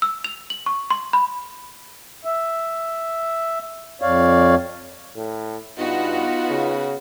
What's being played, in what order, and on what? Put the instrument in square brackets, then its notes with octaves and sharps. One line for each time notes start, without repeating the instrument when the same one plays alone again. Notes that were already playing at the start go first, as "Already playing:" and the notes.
[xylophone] E6
F7
F#7
C#6
C6
B5
[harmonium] E5
F2 C#5 D5 F5
[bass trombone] A2
[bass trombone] G2 [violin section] B3 F#4 [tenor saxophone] D#4 [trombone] F4
[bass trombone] C#3